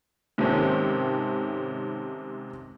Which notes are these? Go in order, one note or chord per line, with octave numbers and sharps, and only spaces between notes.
G#2 C3 D#3 A3 C4 C#4